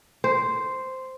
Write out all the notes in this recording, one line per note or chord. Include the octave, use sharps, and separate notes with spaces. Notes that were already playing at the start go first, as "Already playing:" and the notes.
C5